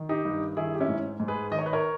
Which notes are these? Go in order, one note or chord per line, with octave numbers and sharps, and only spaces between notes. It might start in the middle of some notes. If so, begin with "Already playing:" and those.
Already playing: D#3
D#4 G4
G2
D#3 E4 G#4
G4
C#4 E4
G#2
G#2
G#4 B4
D#3 D#5
C#5
B4
A#4 C#5